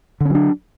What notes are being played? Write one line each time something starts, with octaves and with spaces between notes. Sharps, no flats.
D3 F#3 C#4 D4